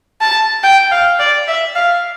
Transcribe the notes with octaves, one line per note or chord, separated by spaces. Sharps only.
A5
G5
F5
D5
E5
F5